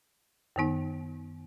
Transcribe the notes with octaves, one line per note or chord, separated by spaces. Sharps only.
F#2 D#3 B3 D#4